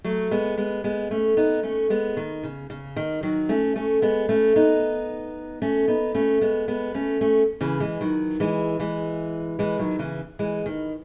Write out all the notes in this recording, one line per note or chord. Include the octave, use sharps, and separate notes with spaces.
F#3 A3
G#3 B3
G#3 B3
G#3 B3
A3 C#4
B3 D#4
A3 C#4
G#3 B3
D#3
C#3
C#3
D#3
D#3 F#3
A3 C#4
A3 C#4
G#3 B3
A3 C#4
B3 D#4
A3 C#4
B3 D#4
A3 C#4
G#3 B3
G#3 B3
A3 C#4
A3 C#4
C#3 E3
E3 G#3
D#3 F#3
E3 G#3
E3 G#3
E3 G#3
D#3 F#3
C#3 E3
E3 G#3
D#3